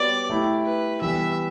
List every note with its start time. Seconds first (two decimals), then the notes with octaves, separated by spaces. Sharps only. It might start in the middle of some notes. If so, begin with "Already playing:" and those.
Already playing: G3 B3 F#4 C#5 D5
0.30 A3 E4 G4
0.65 B4
1.01 E3 G3 B3 E5